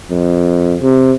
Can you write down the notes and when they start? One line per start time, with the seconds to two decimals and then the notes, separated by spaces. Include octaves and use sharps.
0.11 F2
0.82 C3